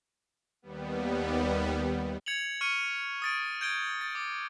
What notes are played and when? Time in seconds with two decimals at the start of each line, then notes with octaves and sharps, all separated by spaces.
0.62 D#2 G3 B3
2.26 G#6 C#7 F7 F#7
2.61 C#6 F6 C#7 D#7
3.22 D#6 A6 D7
3.61 G6 G#6 D7 G7
4.01 A6
4.15 D6